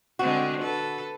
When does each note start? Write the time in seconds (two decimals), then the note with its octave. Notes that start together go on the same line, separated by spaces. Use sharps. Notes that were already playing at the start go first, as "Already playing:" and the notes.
0.19 D3 G#3 C4 F#4
0.61 A4 B4